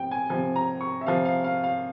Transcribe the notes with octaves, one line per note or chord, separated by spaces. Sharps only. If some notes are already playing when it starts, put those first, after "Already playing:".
Already playing: C3 F3 G5
G#5
C3 F3 G#5
A#5
C#6
E5
C3 F3 F5
F5
F5
F5